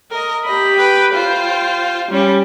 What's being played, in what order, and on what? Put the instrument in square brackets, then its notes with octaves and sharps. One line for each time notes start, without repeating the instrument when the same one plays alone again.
[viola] A#4 D#5
[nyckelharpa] G4 B5 [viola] D#5
[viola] B4 G5
[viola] F4 C5 [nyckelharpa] G5
[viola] G3 C#4